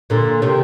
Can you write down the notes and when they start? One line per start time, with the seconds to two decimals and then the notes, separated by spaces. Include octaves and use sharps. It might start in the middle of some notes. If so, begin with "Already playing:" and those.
0.10 A#2 D3
0.42 C3 D#3